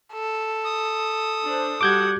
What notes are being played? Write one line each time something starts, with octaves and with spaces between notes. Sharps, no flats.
A4
D#6
D4 C5
G3 F#4 F#5 D6 G6 G#6